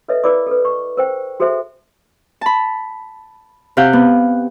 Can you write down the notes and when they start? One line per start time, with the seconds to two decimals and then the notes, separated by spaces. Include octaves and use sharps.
0.08 A4 B4 C#5 D#5 E5
0.24 E4 A#4 B4 D5 B5 D6
0.47 A4 B4
0.65 C#6
0.97 A#4 C5 G5
1.40 F#4 G#4 A4 C5 E5
2.41 A5 B5
3.77 C3 G4 F5 F#5 G6
3.93 B3